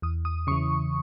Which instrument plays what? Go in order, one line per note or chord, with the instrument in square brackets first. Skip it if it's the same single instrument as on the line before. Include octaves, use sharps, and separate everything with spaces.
[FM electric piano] E2 D#6
D#6
C#3 C#6
E3